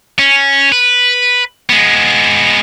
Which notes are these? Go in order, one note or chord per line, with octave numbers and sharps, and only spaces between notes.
C#4
B4
G#3 B3